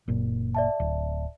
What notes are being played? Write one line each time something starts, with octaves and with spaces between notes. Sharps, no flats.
F#1 A#2
D5 E5 A5
D1